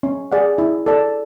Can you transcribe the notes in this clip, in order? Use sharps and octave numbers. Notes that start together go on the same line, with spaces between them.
C#4
G#4 D5 F#5
E4
A4 D5 A5